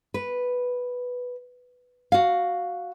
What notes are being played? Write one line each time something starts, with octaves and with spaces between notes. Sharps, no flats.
B4
F#4 F5